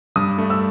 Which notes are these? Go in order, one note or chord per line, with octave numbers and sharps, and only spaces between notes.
G2 D#6
A3
E6